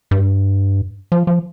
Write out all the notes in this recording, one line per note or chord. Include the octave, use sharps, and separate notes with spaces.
G2
F3
F3